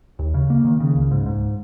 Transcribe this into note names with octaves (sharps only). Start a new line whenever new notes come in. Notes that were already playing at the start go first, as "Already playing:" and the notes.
D#2
C#3
A#3
D#3
C#3
C#2
G#2
G#2